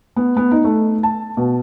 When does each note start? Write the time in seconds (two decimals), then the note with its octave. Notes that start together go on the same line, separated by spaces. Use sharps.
0.16 B3
0.37 B3
0.51 D#4
0.64 A3
1.03 A5
1.37 B2